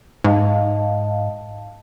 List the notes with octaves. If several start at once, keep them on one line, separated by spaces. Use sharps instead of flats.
G#2 D#5 F5 A5